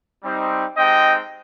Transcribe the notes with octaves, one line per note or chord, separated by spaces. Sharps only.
G3 C4 D#4
G#3 C4 D#4 G4 D#5 G5